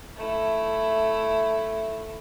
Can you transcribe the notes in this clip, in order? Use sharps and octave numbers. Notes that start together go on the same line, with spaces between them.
A3 E4